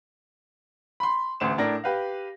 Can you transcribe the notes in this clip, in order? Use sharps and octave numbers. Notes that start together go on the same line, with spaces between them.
B5 C6
A1 D2 E7
A2 D4 A#4 A#6
G4 B4 F5